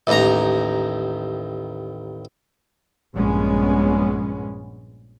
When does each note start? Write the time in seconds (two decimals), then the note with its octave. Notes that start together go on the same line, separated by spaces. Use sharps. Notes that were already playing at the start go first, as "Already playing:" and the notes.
0.07 A1 D#2 A#5
3.14 A#1 G2 G#3 B3 C#4